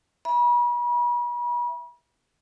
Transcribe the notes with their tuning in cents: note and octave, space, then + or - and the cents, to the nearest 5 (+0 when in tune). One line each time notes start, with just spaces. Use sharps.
E5 +0 B5 -40